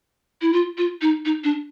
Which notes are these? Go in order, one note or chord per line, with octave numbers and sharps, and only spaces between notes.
E4
F4
F4
D#4
D#4
D4